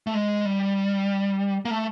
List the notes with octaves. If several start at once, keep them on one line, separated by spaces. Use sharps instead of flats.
A3
G#3
G3
A#3
A3